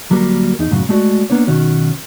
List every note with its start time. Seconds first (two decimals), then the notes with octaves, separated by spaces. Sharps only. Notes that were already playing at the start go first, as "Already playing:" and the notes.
0.10 D2 F#3 G3 A#3 A#4
0.59 E2 D#4
0.71 F#2 A2 C#3 F#3
0.89 G#3 A3 F#4 D5
1.30 A#3 B3 D4 C#5
1.47 B1 D#3 C#4 F#4